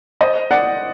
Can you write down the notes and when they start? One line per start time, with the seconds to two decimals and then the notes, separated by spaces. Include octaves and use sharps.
0.21 C5 D#5
0.51 D5 F#5